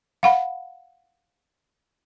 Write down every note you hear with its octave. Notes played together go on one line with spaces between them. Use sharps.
F5 F#5 B5